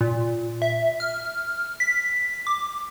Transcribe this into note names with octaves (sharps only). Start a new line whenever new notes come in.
A#2
E5
F6
B6
D6